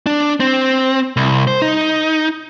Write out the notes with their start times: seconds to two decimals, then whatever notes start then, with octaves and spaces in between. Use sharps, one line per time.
0.06 D4
0.40 C4
1.17 C2
1.47 C5
1.62 D#4